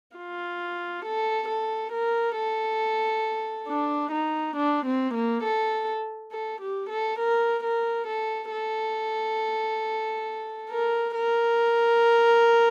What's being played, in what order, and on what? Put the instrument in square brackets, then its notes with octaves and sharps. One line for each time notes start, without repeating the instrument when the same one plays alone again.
[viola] F4
A4
A4
A#4
A4
D4
D#4
D4
C4
A#3
A4
A4
G4
A4
A#4
A#4
A4
A4
A#4
A#4